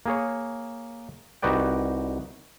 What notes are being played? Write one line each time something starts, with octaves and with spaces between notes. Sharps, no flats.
A#3 G#4 C#5
C2 D#4 F#4 B4 D5 G5